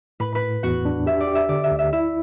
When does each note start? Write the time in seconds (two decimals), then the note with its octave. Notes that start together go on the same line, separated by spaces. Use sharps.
0.20 A2 B4 B5
0.35 B4 B5
0.42 A2
0.63 E2 F#4 F#5
0.85 D4
1.06 G4 E5
1.20 D5
1.27 G4
1.35 E5
1.49 D3 D5
1.64 E5
1.71 D2
1.79 E5
1.93 E4 E5